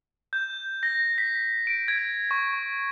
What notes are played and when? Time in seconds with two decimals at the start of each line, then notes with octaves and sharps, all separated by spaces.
0.33 G6
0.83 A#6
1.18 B6
1.67 D7
1.88 G#6
2.31 C#6